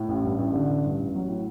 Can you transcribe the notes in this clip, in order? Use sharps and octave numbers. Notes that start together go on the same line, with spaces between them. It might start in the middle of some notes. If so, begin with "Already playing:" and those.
Already playing: A2
A1
G2
A1
D3
A1
G2
A1
F#3
A2